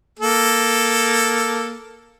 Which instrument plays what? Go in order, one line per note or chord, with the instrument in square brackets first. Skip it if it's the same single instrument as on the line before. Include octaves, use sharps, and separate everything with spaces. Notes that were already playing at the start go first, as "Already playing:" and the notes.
[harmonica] A#3 A4